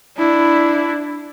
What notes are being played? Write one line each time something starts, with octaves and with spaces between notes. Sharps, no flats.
D4 E4